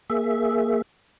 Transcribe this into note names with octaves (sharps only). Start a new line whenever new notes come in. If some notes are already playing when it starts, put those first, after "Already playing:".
A#3 G#4 E5